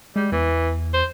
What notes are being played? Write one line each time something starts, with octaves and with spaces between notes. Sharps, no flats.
G3 G#3
E2 E3
C5